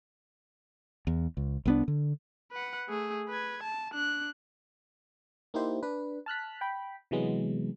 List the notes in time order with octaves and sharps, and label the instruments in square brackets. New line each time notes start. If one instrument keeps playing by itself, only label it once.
[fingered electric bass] E2
C#2
C2 B3 D4
D3
[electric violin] B4 F#5
A3 G#4
B4 G#6
A5
D4 F#6
[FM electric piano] A#3 D#4 E4 G4 C5
D4 B4
A5 F6 F#6 B6
G5 B5
C3 E3 F#3 G#3 B3